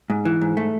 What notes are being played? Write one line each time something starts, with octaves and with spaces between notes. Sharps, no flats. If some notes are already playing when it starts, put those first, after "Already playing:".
G#2
E3
G#2
A3